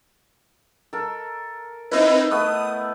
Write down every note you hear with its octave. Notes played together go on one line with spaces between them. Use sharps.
A4 A#4
C4 D#4 E4 B4 D#5
A3 B3 D#6